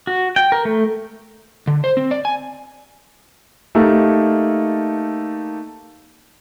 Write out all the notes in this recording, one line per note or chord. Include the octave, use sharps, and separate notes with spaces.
F#4
G5
A#4
A3
D3
C5
C4
D5
G#5
A3 A#3 D#4 G4 A4